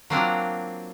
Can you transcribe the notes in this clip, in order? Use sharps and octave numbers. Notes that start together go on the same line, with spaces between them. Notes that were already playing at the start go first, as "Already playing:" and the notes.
F#3 A#3 C4 D4 F4